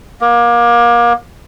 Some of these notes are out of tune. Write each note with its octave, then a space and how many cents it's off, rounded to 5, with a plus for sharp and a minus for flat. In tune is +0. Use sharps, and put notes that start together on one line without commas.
A#3 +30